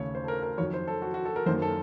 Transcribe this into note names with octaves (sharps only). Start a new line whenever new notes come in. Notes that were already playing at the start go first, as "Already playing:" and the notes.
Already playing: D#2 C#3 A3 C#5
C5
A4
A#4
A#4
F2 D#3 F#3 C#5
C5
A4
F#4
F#4
A4
A#4
F#2 D#3 A#3 C5
A4